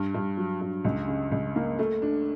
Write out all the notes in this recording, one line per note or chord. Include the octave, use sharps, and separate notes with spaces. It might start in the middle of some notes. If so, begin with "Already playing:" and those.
Already playing: G2
G2
F#3
G2
C#2
C#3
C#2
A#3
A3
D4